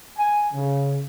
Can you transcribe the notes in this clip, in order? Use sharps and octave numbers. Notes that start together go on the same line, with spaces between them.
G#5
C#3